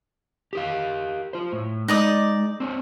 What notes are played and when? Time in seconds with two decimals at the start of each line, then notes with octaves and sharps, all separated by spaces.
0.53 G4 A#4 F5
1.33 F4 C5
1.53 A2
1.88 G#3 D#4 D5 D#6
2.60 C4 D4 C#5